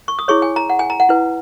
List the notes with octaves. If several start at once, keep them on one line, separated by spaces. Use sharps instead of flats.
C#6
D#6
E4 G#4 C#5 C#6
G#5
A#5
F#5
G#5
A#5
F#5
E4 B4